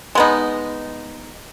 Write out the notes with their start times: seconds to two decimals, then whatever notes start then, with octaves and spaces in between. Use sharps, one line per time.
0.15 G#3 B3 D#4